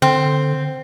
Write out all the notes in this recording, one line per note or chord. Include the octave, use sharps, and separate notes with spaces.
D3 C4